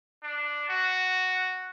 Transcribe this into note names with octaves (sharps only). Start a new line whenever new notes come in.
D4
F#4